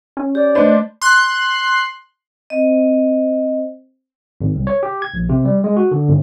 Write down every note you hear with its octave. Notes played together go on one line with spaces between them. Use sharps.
C#4
G4 D5
A3 D4 B4 C5 D#5
C6 F#6
C4 D#5
G#1
C2
C#5
G4
G#6
A#1
C3
G3
G#3
F#4
D3
G1